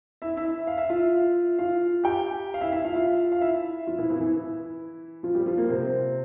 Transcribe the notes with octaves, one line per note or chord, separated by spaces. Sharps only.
E4 E5
E4 E5
F5
E5
F4 F5
F4 F5
G4 G5
F5
E4 E5
F5
E4 E5
F4 F5
F4 F5
F5
E4 E5
F3 F4
E3 E4
E3 E4
E3 E4
F3 F4
G3 G4
F3 F4
A#3
C3 C4